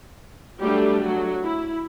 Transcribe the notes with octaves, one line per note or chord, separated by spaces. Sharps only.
F#3 G3 A3 D4 G4
F#3 F#4
E4